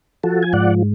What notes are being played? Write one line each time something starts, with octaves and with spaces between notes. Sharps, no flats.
F3 F#4 A4
G#5
G#2 D5 F#5